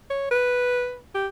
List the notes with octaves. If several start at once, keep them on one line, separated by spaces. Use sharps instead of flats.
C#5
B4
G4